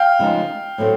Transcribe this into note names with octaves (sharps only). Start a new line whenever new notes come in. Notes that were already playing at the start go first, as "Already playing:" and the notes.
Already playing: F5 G5
C#3 F3 G#3 B3 D#4
A2 F#3 A3 C4